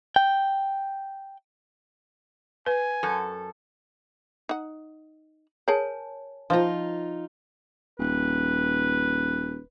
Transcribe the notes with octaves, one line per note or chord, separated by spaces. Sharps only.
G5
B4 G#5
F#2 A4
D#4 F#5
G#4 A#4 C#5 G#5 A5
F3 D#4 F4 A#5
D#1 B4